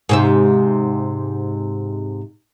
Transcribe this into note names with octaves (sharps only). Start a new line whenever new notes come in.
G#2 C3 E5